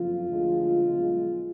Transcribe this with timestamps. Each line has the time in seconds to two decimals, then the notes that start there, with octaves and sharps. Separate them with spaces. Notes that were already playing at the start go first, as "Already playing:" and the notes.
Already playing: F#1 F2 F3 F4
0.29 D2 D3 F3 G#3
0.85 B1 B2 G#3